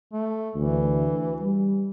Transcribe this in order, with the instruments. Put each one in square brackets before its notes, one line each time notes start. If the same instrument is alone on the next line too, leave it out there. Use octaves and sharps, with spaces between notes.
[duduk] A3
[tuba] D2 [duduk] E3
[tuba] G3